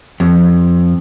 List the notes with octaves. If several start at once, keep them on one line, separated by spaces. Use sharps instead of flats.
F2